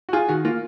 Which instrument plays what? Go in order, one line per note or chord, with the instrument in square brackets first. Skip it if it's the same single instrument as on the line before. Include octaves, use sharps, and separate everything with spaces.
[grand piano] F#4
[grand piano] F4 [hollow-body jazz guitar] G#4
[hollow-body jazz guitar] D#3 [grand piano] F#4
[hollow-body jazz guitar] A#3 [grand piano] F4